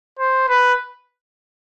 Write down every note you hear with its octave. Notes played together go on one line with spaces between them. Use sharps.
C5
B4